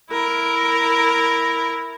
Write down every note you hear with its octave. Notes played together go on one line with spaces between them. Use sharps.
E4 A#4